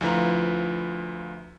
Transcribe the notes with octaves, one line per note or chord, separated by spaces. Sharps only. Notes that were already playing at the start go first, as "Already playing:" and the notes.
D2 F3 E4 F4 B4 A#5